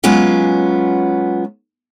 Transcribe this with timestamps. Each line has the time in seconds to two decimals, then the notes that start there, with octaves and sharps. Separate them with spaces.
0.04 F#3 G#3 B3 C#4 F4